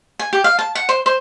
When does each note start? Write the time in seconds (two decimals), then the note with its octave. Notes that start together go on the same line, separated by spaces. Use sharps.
0.19 G#5
0.33 G4
0.44 F5
0.59 A5
0.75 F#5
0.89 C5
1.06 C5